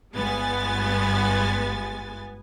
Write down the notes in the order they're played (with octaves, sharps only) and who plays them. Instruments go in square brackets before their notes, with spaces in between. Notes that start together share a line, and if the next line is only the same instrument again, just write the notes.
[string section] G1 G2 G#3 B3 G#5 A6